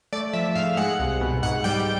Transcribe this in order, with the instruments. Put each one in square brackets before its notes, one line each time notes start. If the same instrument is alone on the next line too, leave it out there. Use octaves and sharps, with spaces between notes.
[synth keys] A3 D5
F3 E5
G#2 F5
G#3 F#5
C2
B2
G#2 F#5
G3 G5